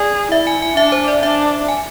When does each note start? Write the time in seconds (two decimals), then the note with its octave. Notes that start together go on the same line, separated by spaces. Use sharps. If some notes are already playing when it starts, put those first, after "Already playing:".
Already playing: G#4 D5
0.32 E4 E5
0.47 G#5
0.62 G#5
0.77 D4 E5
0.92 C5
1.08 D5
1.23 D4 E5
1.68 G#5